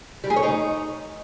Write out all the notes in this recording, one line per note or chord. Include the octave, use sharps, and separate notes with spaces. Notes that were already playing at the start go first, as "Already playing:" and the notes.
G3
G#4
C#5
D#4